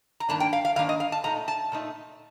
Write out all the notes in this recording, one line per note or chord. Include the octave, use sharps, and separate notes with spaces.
A#5
G2 D#3 A#3 D4 A5
G5
F5
F5
G2 D#3 A#3 D4 F5
D#5
F5
A5
A#2 A3 D#4 A#5
A5
A#2 A3 D#4